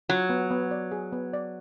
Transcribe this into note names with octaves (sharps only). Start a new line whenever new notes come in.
F#3 F4
B3
B3
D5
G#4
B3
D5